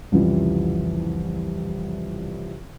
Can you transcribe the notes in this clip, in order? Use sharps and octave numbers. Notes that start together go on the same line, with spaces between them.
C2 F2 C#3 E3 G3